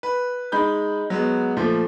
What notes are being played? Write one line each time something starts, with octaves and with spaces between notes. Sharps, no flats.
B4
G#3 D#4 B5 G6
F#3 G#3 B3
A#2 F3 A3